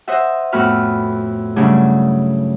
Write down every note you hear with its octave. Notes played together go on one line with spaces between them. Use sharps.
C5 D#5 E5 F#5
F2 A2 B3 F#4 B5 F6
G2 C#3 F#3 A3 D4 E4